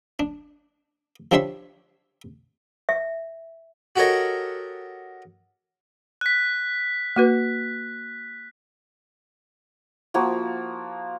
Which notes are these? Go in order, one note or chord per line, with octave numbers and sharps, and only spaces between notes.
D4
F3 G3 D4 C#5 E5 C6
E5
F#4 G4 A4 A#4 C#5 D#5
F#6 B6
A#3 F#4 B4
F3 A#3 F#4